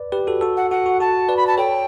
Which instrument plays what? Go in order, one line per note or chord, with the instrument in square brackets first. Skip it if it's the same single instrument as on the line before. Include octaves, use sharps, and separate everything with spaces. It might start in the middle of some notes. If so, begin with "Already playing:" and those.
Already playing: [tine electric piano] B4 D5
G4 B4
F#4 A4
F#4 A4
[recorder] F#5
[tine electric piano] F#4 [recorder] F#5
[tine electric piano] F#4
[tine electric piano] F#4 [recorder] A5
[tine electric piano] B4 D5
[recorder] B5
A5
[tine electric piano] A4 C#5 [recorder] G5